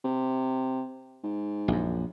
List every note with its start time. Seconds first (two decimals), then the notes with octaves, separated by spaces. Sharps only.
0.04 C3
1.24 G#2
1.68 A#1 F#2